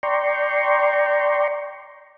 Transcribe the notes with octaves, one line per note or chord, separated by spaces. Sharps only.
D5 G5 A#5 C6 C#6